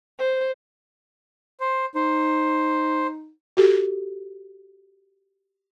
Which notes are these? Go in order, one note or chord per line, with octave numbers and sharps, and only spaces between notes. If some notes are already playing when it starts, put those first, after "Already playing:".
C5
C5
D#4 C5
F#4 G4 A4